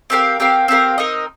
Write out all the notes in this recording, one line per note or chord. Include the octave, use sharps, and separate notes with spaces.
C4 G4 A#4 F5
C4 G4 A#4 F5
C4 G4 A#4 F5
C4 D#4 A#4 D#5